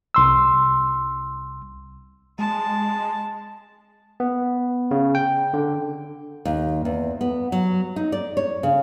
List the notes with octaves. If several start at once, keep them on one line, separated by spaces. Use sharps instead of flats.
C2 C6 E6
G#3 A5
B3
C#3
G5
D3
D#2
E2
B3
F#3
D#4
D5
C#5
C#3